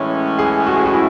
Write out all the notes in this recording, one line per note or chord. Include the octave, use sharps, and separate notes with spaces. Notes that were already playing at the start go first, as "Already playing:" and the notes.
Already playing: A2 E3 G#3 C#4
G#4
F#4
G#4
F#4
E4